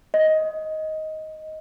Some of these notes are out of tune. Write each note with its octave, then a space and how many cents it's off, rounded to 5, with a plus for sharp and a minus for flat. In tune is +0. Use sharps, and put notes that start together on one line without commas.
D#5 +10